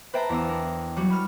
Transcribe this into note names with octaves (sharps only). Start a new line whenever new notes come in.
B4 C5 E5 G5 A5 A#5
E2 B3 D5 F5 E6
D4 A#4
F#3 G3 F#4
B5 F6